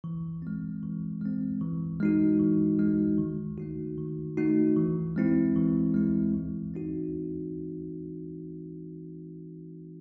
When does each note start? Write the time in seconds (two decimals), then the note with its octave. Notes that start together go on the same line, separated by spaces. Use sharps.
0.04 E3
0.42 G#3 C4
0.83 E3
1.22 G#3 C4
1.61 E3
2.00 G#3 D#4 F#4
2.39 E3
2.79 G#3 D#4 F#4
3.18 D#3
3.58 A3 D#4 F#4
3.98 D#3
4.37 A3 D#4 F#4
4.76 E3
5.16 G#3 C4 E4
5.56 E3
5.94 G#3 C4 E4
6.34 E3
6.74 C4 D#4 F#4